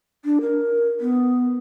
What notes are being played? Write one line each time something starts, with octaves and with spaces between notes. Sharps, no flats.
D4
A#4
B3